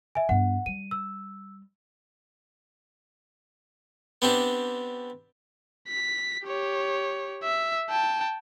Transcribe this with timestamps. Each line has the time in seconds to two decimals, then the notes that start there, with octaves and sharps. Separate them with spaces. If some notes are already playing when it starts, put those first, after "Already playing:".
0.15 E5 G#5
0.29 G2 B3 F#5
0.66 G3 D#7
0.91 E6
4.22 B3 C4 D4 G4
5.88 B6
6.45 G4 C#5
7.43 E5
7.90 G5 A5